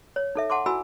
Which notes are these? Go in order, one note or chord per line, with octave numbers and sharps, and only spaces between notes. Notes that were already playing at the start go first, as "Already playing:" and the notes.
C#5
D#4 A4 E5
F#5 A5 C6 D6
E4 F#4 G#5 B5 E6